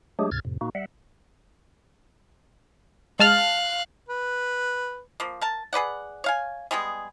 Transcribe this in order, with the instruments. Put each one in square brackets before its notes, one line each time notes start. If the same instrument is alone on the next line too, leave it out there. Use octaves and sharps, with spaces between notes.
[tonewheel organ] F#3 G#3 A3 D4 G4 G#4
D2 G#2 C3 F6 G#6 A6
F2 A2 C3
A#2 A#3 D#4 F#4
G3 E5 F#5
[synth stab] G#3 A5 F6 [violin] F5 F#6
[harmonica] B4
[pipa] F3 A#3
A#4 A5
G#4 B4 D5 F#5
C#5 F5 G#5
G3 G#3 B3 G#4